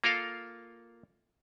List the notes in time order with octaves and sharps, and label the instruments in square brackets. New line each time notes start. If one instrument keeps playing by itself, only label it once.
[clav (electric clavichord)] A#3 F4 A4 A#4 F5